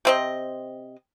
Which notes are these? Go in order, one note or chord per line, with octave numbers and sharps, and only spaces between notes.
C3 C4 D#5